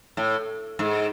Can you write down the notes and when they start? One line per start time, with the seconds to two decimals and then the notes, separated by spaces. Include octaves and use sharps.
0.17 A2
0.79 G#2